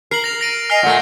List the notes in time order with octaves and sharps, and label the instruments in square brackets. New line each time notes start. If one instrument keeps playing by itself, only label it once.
[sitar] A#4 [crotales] C7 F#7
[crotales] A#6 F7
A#6 D7 D#7
[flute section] D#5 G#5 [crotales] F6 C7 F7
[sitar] A#2 A3 [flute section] F#5